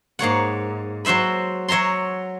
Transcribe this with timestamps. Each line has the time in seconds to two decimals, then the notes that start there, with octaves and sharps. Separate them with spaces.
0.19 G#2 A#3 C#5 F#5
1.05 F#3 F#4 C5 E5 B5
1.68 F#3 C#5 E5 A#5 C6